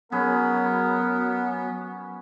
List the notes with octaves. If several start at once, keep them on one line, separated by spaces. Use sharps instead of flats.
F#3 B3 C#4 G#4 A#4 B4